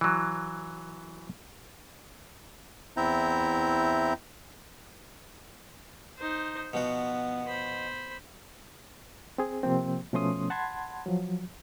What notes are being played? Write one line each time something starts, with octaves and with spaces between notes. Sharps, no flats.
E3 F#3
E2 C4 E4 E5 A#5 G6
D#4 C5
B2 F3 B3 F#4
C5 B5
C4 G#4
C3 F3 A#3 C4
B2 F3 A3 C#4 C6 D#6
F#5 A5 B5 C6 G#6
F3 F#3